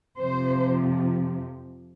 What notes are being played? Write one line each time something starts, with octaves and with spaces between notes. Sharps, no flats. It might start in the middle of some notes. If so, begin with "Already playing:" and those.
F2 C3 F3 C5